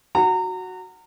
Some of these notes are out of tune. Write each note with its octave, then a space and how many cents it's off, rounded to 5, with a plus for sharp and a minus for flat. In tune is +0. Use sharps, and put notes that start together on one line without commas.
F#4 +0 F#5 +0 A#5 -30